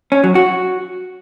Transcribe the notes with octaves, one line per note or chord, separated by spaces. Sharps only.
C#4
F#3
F#4